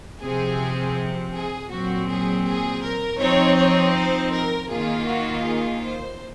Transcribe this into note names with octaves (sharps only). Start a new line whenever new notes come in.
C3 F3 C4 G#4
G#4
A#2 F#3 C4 F#4
G#4
G#4
A#4
F3 C4 D#4 C#5
C#5
C5
A#4
D#3 A#3 F4 G#4
F#4
G#4
C5